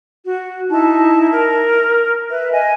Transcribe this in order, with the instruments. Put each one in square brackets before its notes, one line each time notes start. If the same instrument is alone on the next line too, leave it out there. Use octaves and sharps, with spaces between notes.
[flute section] F#4
D#4 E4 A5
A#4
B4 E5
D#5 G#5